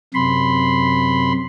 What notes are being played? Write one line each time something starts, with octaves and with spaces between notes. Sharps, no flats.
F#2 C3 B5 C6